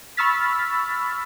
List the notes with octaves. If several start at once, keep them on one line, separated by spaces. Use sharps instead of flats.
B5 C#6 E6 F6 A6 B6